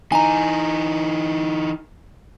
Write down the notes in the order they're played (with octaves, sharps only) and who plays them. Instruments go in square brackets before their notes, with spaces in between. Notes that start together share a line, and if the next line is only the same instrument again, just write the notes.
[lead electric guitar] E3 D#4 [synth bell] G#5 A#5